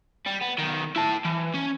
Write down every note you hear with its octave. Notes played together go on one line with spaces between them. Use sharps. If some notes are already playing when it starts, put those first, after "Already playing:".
G3
B3
B1 D#3
E4 A5
E3
C#4